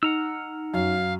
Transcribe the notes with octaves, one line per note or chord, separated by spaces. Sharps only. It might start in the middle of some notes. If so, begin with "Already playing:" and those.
D#4 F#5 A#5 E6 F6
F#2 F5